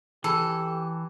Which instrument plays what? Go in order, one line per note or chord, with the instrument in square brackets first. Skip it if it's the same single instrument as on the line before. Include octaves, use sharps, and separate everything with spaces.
[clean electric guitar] E3 [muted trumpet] G4 [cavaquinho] A4